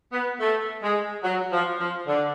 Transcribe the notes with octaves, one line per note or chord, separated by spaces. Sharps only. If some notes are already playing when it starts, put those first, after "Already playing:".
B3
A3
G#3
F#3
F3
F3
D3